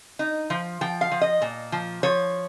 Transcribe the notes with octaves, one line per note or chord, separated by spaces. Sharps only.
D#4
F3
F3 G5
F5
F3
D#5
A#2
F3
F3 C#5